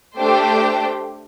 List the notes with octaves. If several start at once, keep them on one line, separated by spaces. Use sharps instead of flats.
A3 D4 G4 C5 G5